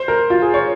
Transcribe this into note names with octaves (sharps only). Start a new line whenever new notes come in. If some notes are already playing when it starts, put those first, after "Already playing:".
Already playing: C5
A#4
F4
G#4
C#5